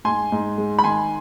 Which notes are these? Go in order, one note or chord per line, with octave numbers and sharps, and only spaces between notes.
G#2 G#5 C6
G#2
G#3
B5
D#3 G#5 C6